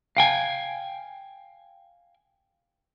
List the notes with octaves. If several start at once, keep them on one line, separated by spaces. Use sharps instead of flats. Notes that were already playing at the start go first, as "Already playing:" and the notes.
F5 G5 G#5